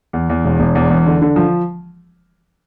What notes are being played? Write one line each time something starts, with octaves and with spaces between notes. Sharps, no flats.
E2
E2
E1
E1
E2
E2
D3
D3
F3